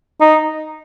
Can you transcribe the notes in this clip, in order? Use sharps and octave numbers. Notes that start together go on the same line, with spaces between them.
D#4